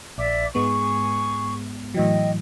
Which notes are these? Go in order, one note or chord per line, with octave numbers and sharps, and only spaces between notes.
A#1 D5 E5 D6
G#2 G#3 B3 G#4 C#6
A2 E3 F#3 D#5 G5